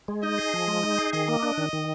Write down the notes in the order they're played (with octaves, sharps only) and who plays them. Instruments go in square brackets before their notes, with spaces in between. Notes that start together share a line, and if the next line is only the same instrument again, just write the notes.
[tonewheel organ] G#3
[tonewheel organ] D#4 [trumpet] D#5
[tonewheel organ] G#4
F3
G#3
D#4
G#4
[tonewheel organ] D#3 [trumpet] D#5
[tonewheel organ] A#3
D4
D#3
D#3